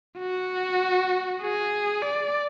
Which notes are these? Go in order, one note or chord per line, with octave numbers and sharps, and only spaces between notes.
F#4
G#4
D5